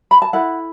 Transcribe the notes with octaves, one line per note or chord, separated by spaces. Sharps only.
B5
A5
E4 A4 F#5